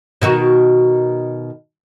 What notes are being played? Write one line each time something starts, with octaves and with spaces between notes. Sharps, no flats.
B2 D#3 F#4